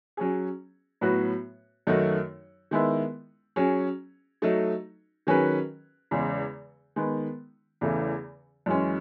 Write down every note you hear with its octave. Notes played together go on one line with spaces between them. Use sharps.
F#3 C#4 G#4
A2 F#3 B3 F#4 B4
F#2 D#3 A3 D#4 F#4
D#3 G#3 B3 E4
F#3 C#4 G#4
F#3 A3 D#4
D#3 F#3 C#4 G#4 B4
E2 C#3 G#3
D#3 G#3 B3
E2 C#3 E3 A3
F#2 E3 G#3 C#4